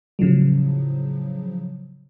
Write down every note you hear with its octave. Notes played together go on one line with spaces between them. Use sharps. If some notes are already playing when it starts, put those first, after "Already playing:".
A2 C#3 F3 F#3